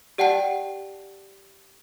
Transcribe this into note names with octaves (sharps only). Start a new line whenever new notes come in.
G4 D5 F#5 G5 A5 C7